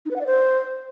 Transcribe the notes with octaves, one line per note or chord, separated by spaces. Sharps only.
D#4
B4
F#5
D5
C5